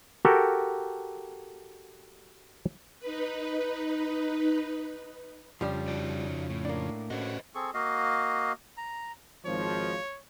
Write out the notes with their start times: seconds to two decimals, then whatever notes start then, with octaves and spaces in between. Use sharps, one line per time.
0.25 F#4 G4 A4 A#4 G5
2.99 D#4 B4
5.61 F2 C#3 F3 G3 D4
5.88 D#4 F#4 D5
6.50 A2
6.65 A#3 D4
7.10 A2 C#4 F#4 B4 C5 D#5
7.55 C4 G#4 A4 C#6
7.74 A#3 F#4 D#5 F5
8.77 A#5
9.46 G#1 F3 C#5